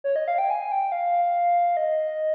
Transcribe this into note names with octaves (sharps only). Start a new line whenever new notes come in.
C#5
D#5
F5
G5
G#5
G5
F5
D#5